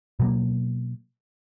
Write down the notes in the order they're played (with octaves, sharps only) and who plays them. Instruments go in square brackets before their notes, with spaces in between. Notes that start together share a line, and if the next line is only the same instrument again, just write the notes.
[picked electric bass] B2 F#3 A#3